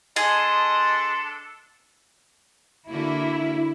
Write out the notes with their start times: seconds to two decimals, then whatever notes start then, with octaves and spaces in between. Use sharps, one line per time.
0.16 D4 G#4 A4 D#5 C6
2.89 D3 A#3 E4 F#4